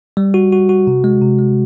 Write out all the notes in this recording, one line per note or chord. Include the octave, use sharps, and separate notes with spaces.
G3
F#4
F#4
F#4
C3
G#3
C3
G#3